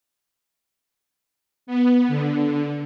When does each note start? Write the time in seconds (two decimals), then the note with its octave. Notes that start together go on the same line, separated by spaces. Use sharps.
1.67 B3
2.08 D3